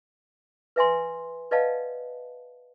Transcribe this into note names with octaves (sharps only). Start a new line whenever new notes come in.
B4 E5 G#5 C6
B4 D5 D#5 F5 F#5 A5